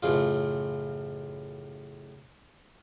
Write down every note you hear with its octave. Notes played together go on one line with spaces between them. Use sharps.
A1 F#2 C#3 F4